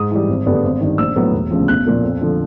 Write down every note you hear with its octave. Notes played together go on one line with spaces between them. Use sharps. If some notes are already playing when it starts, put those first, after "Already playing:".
Already playing: G#2 D#6
E3 G3
G#1
G2 D3 G3 B3
G#1
G2 D#3
A#1 E6
A2 F#3 B3
E1
D2 C#3 F3
B1 F#6
A#2 F3 A#3
F2
D3 F3